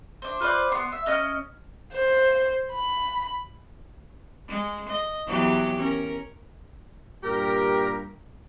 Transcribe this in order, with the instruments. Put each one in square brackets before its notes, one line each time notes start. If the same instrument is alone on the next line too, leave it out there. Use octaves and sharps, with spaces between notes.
[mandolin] D4 C5
F4 B4 C5 D5
B3 C6
E5
C#4 D#5 F6
[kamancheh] C5
B5
[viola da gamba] G#3
D#5
E2 F#3 G4
C#4 A#4
[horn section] G2 A#2 G4 A#4